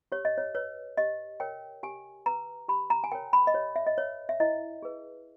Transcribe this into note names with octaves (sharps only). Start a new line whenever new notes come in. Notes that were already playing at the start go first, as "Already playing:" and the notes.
G4 C#5
D#5
C#5
B4 C#5
G4 D#5
A#4 C#5 G5
G4 G#5
B4 A#5
G4 B5
A#5
G#5
A#4 C#5 G5
B5
D#5
G4 C#5
E5
D#5
B4 C#5
E5
E4 D#5
G#4 B4